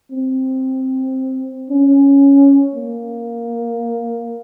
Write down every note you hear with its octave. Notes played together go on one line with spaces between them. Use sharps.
C4
C#4
A#3